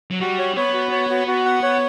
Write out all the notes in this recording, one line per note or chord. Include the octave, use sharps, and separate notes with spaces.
F#3
G3 F#4
C#5
B3 C#5
F#4
C#5
F#4
F#4
F#5
C#5